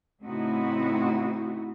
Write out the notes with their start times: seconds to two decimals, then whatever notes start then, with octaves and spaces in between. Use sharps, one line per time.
0.22 A2 C#3 C4 D#4 E4 F#4